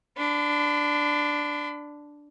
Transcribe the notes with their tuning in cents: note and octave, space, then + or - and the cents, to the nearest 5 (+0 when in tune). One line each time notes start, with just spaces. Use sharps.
D4 +0 B5 +45